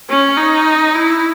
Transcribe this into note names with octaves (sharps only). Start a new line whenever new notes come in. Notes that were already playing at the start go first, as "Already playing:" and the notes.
C#4
D#4
E4